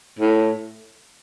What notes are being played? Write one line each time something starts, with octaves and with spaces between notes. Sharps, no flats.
A2